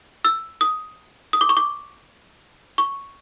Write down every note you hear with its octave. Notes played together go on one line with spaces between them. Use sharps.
E6
D#6
D#6
D6
C#6
D6
C#6